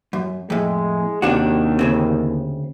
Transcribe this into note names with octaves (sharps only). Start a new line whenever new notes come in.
F#2
F2 A2 G#3
D#2 C3 D4 F#4
D2 C#3 C4